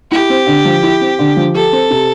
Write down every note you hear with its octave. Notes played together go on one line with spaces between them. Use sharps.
E4 G4
C4
D3
F3
E4
C4
D3
F3
G4 A4
C4
C3